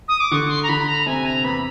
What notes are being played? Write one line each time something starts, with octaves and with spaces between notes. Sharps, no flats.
D#6
D6
D3 C#6
C6
A#5
D3 B5
A#5
C3 G#5
A#5
E2 B5